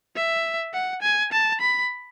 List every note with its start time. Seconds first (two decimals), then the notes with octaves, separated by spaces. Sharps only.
0.16 E5
0.74 F#5
1.03 G#5
1.33 A5
1.61 B5